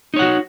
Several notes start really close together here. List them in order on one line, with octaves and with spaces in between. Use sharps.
D#4 C#5 F#5 F#4